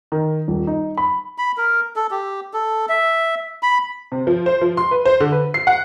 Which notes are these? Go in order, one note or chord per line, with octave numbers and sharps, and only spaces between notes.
D#3
D#1
D#4
B5
B5
A#4
A4
G4
A4
E5
B5
C3
F3
C5
F3
C6
B4
C5
D3
B4
C7
F#5